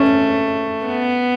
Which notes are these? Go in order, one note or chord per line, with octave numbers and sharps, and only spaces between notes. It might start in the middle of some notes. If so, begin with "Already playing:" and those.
Already playing: A3 C#4
B3